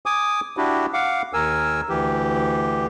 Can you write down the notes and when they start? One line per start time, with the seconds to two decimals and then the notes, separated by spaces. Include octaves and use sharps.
0.06 G#5 D6 D#6
0.57 D4 E4 F#4 G4
0.93 F5 F#5 D6
1.33 D#2 A#4 G#5 E6
1.89 D2 E3 G4